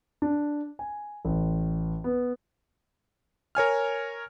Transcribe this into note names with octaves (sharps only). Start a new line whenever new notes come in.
D4
G#5
A1
B3
A#4 C#5 G#5 F6